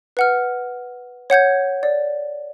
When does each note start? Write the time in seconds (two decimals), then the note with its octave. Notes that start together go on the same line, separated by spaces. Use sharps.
0.17 B4 F#5 F6
1.30 C#5 F#5 G6 G#6
1.83 D5